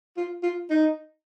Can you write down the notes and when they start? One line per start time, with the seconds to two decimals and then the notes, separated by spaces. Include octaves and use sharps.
0.17 F4
0.43 F4
0.70 D#4